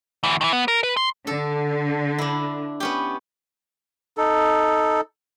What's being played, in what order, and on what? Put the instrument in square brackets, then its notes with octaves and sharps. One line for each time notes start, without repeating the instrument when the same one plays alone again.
[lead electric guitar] D2 E3
D#3 E3
B3
A#4
B4
C6
[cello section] D3 [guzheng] A4
[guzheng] D4 E4
B3 C#4 G4
[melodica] D#4 A4